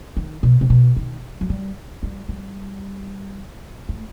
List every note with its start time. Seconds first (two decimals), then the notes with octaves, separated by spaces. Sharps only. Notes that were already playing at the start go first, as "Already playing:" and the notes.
0.17 D#3
0.43 B2
0.61 C3
0.70 B2
0.96 D#3
1.41 F#3
1.50 G3
2.03 G3
2.29 G3
3.89 A3